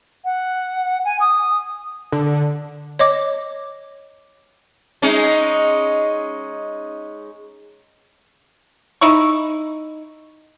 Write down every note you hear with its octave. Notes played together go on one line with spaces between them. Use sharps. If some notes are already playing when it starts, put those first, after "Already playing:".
F#5
G#5
D#6
D3
C#5 D#5 D6
G#3 C#4 D#4
D#4 E4 C#6